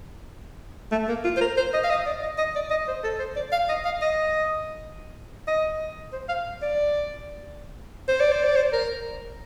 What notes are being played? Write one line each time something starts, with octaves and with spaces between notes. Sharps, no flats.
A3
A#3
F4
C5
A#4
C5
D#5
F5
D#5
D5
D#5
D#5
D5
D#5
C5
A4
C5
D5
F5
D#5
F5
D#5
D#5
C5
F5
D5
C5
D5
C5
D5
C5
A#4